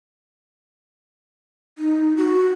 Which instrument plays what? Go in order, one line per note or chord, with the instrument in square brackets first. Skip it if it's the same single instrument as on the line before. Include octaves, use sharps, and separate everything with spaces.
[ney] D#4
F#4